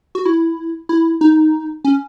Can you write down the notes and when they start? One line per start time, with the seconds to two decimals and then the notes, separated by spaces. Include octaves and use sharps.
0.15 F#4
0.25 E4
0.89 E4
1.21 D#4
1.85 C#4